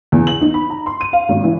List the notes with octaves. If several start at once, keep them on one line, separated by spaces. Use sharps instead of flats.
E2
F#7
D#4
B5
A#5
C6
D#7
F5
G#1
E3